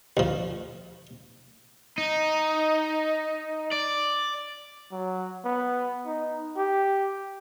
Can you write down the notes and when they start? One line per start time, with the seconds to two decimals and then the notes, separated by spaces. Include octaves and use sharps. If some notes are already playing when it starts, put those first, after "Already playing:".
0.17 D2 F3
1.98 D#4
3.73 D5
4.92 F#3
5.44 B3
6.06 D#4
6.56 G4